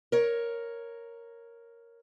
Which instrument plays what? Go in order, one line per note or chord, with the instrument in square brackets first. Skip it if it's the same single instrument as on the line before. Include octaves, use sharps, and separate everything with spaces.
[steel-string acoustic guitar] A#4 C#5